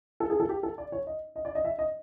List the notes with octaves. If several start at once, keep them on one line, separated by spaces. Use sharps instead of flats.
A4
G#4
A4
G4
A4
D5
C#5
D#5
D#5
D5
D#5
E5
D#5